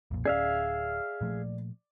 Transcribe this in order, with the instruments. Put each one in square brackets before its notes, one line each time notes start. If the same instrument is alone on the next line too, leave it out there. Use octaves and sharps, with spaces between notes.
[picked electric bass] B1 F2 A#2
[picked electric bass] D1 G1 C#4 [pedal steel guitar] G#4 E5 F5 [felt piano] D5
[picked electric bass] A#2 F3 A3